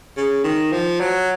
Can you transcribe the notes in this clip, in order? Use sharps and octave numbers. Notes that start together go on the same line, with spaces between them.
C#3
D#3
F3
F#3